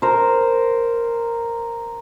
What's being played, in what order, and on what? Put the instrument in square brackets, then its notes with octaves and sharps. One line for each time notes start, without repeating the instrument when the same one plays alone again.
[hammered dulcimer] A#4 C5